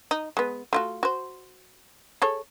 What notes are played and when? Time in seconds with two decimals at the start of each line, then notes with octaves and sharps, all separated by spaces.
0.11 D#4
0.37 G#3 B3
0.73 A3 F4 F#4
1.03 F#4 C5
2.22 G#4 A4 C#5